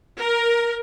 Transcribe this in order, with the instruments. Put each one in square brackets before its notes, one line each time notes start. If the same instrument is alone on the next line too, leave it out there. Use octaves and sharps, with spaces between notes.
[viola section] A#4